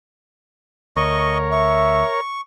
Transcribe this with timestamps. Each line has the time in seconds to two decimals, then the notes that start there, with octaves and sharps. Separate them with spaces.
0.97 D2 A#4 C#5 D#5 C#6
1.52 E5 C#6